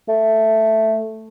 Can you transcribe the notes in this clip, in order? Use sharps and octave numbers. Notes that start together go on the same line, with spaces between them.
A3